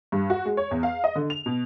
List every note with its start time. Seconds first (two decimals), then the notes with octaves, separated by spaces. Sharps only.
0.12 G2
0.30 F#4
0.45 G#3
0.57 C#5
0.71 E2
0.83 F5
1.04 D#5
1.15 D3
1.30 F7
1.46 B2